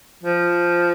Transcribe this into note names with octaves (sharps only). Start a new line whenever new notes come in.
F3